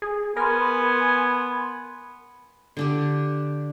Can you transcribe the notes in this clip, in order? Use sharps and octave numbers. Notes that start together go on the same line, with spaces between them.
G#4
B3 A#4 G#5 B5 C6
D3 D4 G4